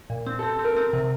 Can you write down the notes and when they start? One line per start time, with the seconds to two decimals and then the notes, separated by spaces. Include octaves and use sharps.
0.10 A#2
0.26 C4
0.39 A4
0.43 C4
0.59 C4
0.64 A#4
0.76 C4
0.93 C3